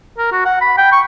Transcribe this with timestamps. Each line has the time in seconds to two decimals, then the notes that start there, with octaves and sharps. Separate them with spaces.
0.18 A#4
0.32 F#4
0.45 F#5
0.61 B5
0.78 G5
0.92 C#6